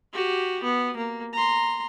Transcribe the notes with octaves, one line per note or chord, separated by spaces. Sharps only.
F#4 G4
B3
A#3
A#5 C6